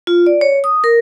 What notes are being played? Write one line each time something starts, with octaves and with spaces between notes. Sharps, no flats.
F4
D5
C#5
D#6
A#4